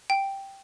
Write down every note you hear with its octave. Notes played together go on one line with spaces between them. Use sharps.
G5